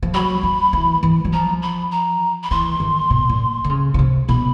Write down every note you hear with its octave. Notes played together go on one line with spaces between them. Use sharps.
F3
F#3 B5
F#3
E3
E3
F#3
F3 A#5
B5
A#5
B5
E3 C6
D#3
B2
A#2
D3
C#3
C#3
C3
B2 B5